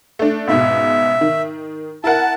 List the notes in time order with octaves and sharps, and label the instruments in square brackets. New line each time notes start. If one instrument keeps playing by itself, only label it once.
[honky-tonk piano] A3 D4
[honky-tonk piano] C#2 G#2 B2 [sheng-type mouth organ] E5
[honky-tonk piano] D#3
[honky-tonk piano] E4 A#4 F#5 [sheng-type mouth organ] A5